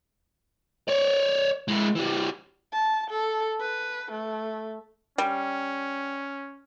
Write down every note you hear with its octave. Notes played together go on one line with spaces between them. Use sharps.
C#5 D5
G#3 E4
E3 G3
A5
A4
B4
A3
G3 C#4